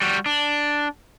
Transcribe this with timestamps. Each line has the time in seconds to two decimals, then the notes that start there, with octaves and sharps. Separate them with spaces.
0.02 G3 F#4
0.26 D4